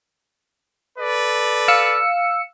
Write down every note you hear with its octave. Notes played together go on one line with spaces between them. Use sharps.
A4 B4 D5
F5 E6 C#7